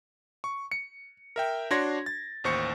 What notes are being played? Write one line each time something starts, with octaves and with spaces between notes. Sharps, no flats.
C#6
C#7
A#4 E5 G5
D4 F#4 C#5 C6 G#6 A#6
A6
A1 D#2 C5 C#6 C#7